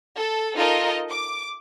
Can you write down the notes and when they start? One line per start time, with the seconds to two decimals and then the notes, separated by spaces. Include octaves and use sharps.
0.15 A4
0.55 D#4 F4 A4 A#4 D#5
1.10 D6